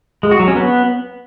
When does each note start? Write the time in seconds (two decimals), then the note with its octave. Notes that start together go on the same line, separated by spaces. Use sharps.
0.23 G#3
0.31 F#4
0.40 F#3
0.48 C#4
0.56 B3